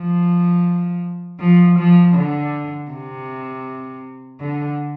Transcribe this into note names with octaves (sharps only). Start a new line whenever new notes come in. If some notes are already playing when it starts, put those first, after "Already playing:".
Already playing: F3
F3
F3
D3
C3
D3